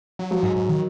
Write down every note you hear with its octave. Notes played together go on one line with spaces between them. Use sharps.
F#3
F3 F#3
G#2
G#2
D#3